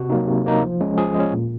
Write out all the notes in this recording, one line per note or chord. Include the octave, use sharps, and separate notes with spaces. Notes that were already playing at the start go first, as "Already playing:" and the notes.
Already playing: C3 F#4
F#3 A#3 D#4
C3
F#3 A#3 D#4
F3
G#3 C#4
F3 G#4
G#3 C#4
A#2